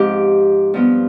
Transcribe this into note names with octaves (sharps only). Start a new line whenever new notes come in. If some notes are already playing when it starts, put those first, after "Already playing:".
Already playing: G#2 F3 C4 G4
G2 F3 B3